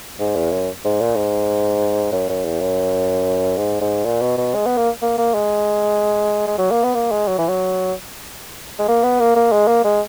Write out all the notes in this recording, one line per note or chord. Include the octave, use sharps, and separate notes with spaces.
G#2
E2
F#2
G#2
A#2
G#2
F#2
F#2
E2
F#2
G#2
G#2
A#2
B2
B2
G#3
B3
A#3
A#3
A#3
G#3
G#3
F#3
A#3
B3
A#3
G#3
F#3
E3
F#3
G#3
A#3
B3
A#3
A#3
G#3
A#3
G#3